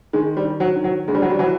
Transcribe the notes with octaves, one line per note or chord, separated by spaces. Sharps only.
D#3 G#3
G3
D#3
F#3
D#3
F#3
D2 G#3
G3
F#3
G3
E3 F#3